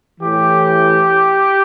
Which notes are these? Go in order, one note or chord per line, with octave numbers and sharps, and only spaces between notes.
A2 E3 G4